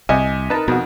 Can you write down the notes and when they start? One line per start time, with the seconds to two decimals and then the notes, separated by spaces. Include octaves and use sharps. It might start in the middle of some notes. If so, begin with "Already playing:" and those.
0.09 C2 C3 D#5 G#5
0.50 D#4 A#4 B4 A5
0.68 F2 B2 F#4